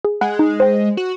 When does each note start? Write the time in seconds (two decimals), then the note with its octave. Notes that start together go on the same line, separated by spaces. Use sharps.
0.05 G#4
0.21 G#3 F#5 B5 F#6
0.39 D#4
0.60 C5 G5
0.97 F#4